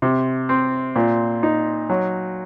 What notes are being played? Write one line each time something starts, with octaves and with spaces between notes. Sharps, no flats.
C3
C4
A#2
D#4
F#3